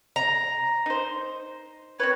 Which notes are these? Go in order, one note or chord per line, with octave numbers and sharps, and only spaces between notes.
A#5
D#4 C5
C4 B4 C#5